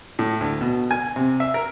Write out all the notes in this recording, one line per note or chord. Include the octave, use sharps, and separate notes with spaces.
A2
D2
B2
G#5
C3
E5
A#4